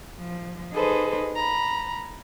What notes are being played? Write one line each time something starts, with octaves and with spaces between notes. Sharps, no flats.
F3
D#4 G#4 A4 B4 C5
A#5 B5